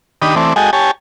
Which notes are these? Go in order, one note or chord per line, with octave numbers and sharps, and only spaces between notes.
D#3 D4 G4 B5 D#6
E3 A3 C4 D5
G#3 F#4 A4 D#5 G5 G#5
G4 C#5 G#5 A5